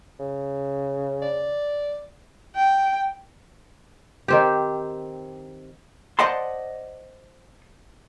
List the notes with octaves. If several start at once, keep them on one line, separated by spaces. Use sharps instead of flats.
C#3
D5
G5
D#3 C4 G4
C5 D5 D#5 F#5 A5 C6